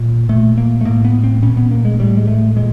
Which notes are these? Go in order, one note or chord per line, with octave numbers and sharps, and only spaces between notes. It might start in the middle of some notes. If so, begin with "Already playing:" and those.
Already playing: A#2
A#2 A3
A#3
A3
A2 A#3
B3
C4
A#2 C#4
B3
A#3
G#3
A2 G3
G#3
A3
A#2 G#3